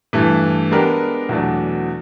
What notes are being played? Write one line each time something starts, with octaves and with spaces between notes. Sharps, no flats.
G2 E3 A3
G#3 B3 D4 G4 A#4
E2 B2 F#3 A3 D4